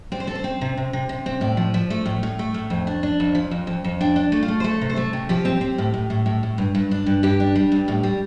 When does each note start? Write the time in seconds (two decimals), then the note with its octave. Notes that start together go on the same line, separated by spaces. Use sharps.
0.12 C4 D5
0.20 C5
0.27 C4 A4
0.35 C5
0.44 C4
0.61 C3
0.77 C3
0.93 C3
1.09 C3
1.26 C4
1.41 A2 D5
1.57 F3
1.74 F3
1.90 A3
2.06 A2
2.23 A2
2.39 A3
2.54 A2
2.70 F2
2.87 D4
3.03 D4
3.20 F2
3.35 F3
3.51 F2
3.67 F2
3.84 F2
4.01 D4 G5
4.16 D4
4.32 A3
4.43 F4
4.48 A3
4.60 C5
4.64 A3 A4
4.81 C3
4.90 C5
4.96 A3 A4
5.13 C3
5.29 F3 G4
5.45 C4
5.61 C4
5.78 A2
5.94 A2
6.10 A2
6.26 A2
6.43 A2
6.58 G2
6.75 G2
6.91 D4
7.06 G2
7.23 G2 G4
7.40 D4
7.56 G3
7.72 G2
7.88 A2
8.03 G3